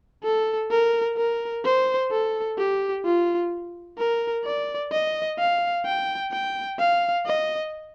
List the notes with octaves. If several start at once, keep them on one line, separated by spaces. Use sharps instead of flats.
A4
A#4
A#4
C5
A4
G4
F4
A#4
D5
D#5
F5
G5
G5
F5
D#5